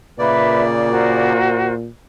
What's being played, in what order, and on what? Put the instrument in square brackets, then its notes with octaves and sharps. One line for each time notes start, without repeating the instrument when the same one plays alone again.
[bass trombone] A#2 [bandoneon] C#3 A#3 D5 [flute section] B4 E5
[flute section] F#4 A#4 C5